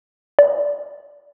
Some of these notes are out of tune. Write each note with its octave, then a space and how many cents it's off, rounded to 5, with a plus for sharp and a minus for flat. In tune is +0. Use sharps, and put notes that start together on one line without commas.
D5 -15